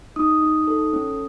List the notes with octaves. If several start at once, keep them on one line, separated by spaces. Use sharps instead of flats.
D#4 D#6
D#4
A4
C#4